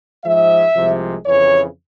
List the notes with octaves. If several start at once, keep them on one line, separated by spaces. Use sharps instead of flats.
G#2 F3 G#3 E5
C2 C3 F3 G#3
F2 C#3 E3 C#5